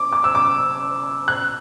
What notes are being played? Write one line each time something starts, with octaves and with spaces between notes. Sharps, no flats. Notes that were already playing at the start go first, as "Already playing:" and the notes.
Already playing: D6
D6
E6
D6
F#6